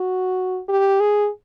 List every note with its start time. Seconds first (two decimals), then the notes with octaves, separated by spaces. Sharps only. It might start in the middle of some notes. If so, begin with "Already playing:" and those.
Already playing: F#4
0.69 G4
1.00 G#4